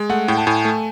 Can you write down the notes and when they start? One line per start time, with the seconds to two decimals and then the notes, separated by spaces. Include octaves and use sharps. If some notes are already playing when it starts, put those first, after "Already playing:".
Already playing: G#3
0.09 A3 F#5
0.28 A2 G5
0.38 A5
0.46 A2 G#5
0.65 A3